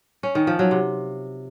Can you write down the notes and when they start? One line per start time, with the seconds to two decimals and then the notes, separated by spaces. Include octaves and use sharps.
0.23 C#4
0.35 D#3
0.47 F3
0.59 F#3
0.71 C3